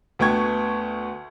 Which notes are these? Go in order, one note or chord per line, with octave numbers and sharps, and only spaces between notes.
D2 A3 B3 G5 C#6 G#6